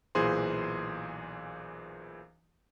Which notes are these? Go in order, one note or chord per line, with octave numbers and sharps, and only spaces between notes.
B1 A#2 E3 G#4 C5 C6